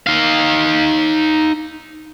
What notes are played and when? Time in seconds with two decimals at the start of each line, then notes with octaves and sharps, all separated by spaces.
0.07 D#4 F5